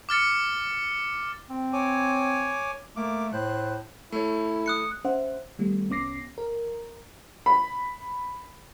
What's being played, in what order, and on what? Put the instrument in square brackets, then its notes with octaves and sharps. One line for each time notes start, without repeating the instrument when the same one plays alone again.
[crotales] D6 F6 A6 C#7
[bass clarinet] C4
[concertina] C#5 G#5 D6
[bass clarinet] A3 [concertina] A#3 D6
[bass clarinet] A2 [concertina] C5 F#6
[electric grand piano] A3 C#5 [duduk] E4
[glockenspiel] D#6 F#6 C#7
[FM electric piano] C#4 C5 E5 F#5
D#3 G3 A3 B3
C2 B3 C#4 D6 A#6 C7
A#4
[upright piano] B5